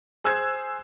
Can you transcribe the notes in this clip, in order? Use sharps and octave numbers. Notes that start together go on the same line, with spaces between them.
G#4 C5 E6 F#6 G#6